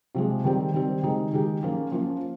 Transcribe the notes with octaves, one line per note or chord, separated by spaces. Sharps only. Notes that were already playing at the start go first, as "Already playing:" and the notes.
C3 F3 G#3
D#3 G3 C4 G4
D#3 G3 C4 G4
D#3 G#3 D#4 G4
D#3 G#3 D#4 G4
F3 A#3 C#4 F4
F3 A#3 C#4 F4